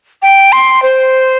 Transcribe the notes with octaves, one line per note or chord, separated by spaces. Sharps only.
G5
C6
C5